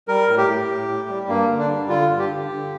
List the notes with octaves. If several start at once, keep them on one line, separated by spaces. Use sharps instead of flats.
G3 A#4
A2
G4
A2
A2
A2
G3
G2 A#3
D3
D4
G3
D3 F4
G2
G4
D3
D3